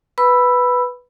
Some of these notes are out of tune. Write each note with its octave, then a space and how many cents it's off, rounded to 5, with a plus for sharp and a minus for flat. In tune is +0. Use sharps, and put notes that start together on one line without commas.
B4 +0 B5 +0 E6 +10